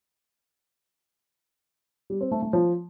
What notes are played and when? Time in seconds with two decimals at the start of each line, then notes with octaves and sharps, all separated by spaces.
2.10 G3
2.21 C4
2.32 A3
2.42 A3
2.53 F3